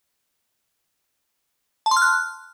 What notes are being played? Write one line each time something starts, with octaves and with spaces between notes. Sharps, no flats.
A5
C6
F6
F#6